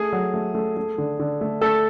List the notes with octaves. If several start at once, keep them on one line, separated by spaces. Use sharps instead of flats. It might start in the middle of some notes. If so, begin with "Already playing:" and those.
Already playing: A3 G#4
F#3
A3
A3
A3
D3
D3
A3
A3 A4